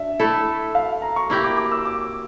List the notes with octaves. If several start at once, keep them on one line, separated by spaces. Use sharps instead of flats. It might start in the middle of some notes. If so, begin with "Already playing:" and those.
Already playing: D4 E5
A3 E4 A4
F5
A#5
C#6
A#3 E4 G4
D6
D6
E6
D6